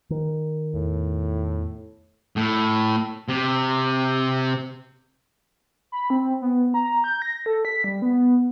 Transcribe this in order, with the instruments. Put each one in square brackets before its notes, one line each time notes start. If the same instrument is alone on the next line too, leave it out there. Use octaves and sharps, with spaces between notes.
[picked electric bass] D#3
[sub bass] E2 [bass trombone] A2
[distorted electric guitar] A2
C3
[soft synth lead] B5
C4
B3
A#5
G6
A#6
A4
B6
G3
B3